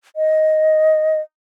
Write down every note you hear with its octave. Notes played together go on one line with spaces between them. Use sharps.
D#5